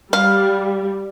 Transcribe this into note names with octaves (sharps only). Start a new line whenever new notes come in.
G3 F5